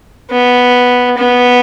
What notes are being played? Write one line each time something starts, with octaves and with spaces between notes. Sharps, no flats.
B3
B3